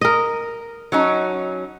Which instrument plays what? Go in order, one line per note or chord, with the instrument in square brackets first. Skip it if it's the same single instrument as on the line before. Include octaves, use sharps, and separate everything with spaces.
[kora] A#4 D#5
[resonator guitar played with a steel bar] F#3 C#4 D#4